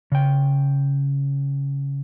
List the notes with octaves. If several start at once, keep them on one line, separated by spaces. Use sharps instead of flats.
C#3 G5